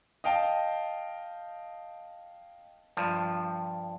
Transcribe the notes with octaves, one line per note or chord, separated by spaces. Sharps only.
D#5 F5 G5 A5
G2 F3